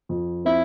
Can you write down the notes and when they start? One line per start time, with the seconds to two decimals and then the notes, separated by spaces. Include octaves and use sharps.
0.09 F2
0.45 C4 E4